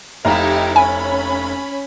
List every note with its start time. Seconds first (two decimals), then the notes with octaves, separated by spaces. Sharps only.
0.25 F1 D#4 E4 G4 F5 A#5
0.76 C#4 G#5 B5